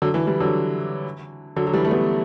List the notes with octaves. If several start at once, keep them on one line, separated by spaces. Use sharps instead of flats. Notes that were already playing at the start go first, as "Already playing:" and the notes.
D3 F#3
E3
E3 G3
D3 F#3
D3 F#3
F#3
E3 G3
A3
G3 B3